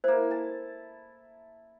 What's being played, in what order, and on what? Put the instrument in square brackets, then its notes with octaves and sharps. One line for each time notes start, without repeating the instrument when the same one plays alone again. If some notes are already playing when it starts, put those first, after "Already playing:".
[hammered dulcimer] A#3 E4 [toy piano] C5
[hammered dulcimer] A5